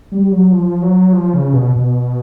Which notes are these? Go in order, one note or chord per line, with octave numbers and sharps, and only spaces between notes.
G3
F#3
F3
F#3
F3
C#3
B2
B2